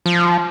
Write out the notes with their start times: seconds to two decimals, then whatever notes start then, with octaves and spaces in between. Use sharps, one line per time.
0.06 F3